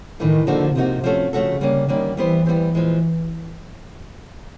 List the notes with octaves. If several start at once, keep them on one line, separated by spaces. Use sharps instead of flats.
A2 D#3 E3 A3
D3 F3 A#3 D#4 F#4
C3 F3 A#3 D#4 F#4
F3 A3 C#4 F#4 A4
C#3 F3 A3 C#4 F#4 A4
D3 G3 A#3 C#4
D3 D#3 G3 A#3 C#4
E3 G3 B3 E4 G4 C5
G3 B3 E4 G4 C5
A#2 F3 G#3